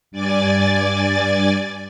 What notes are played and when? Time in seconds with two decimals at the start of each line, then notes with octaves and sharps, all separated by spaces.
0.11 G2 D5 G#5 A6